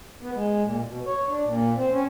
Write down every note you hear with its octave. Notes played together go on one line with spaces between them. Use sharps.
B3
G#3
A#2
B2
C#5
D4
A#2
C4
C#4